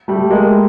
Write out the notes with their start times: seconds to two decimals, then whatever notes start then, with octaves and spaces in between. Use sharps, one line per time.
0.08 G3 A3
0.30 G#3 A#3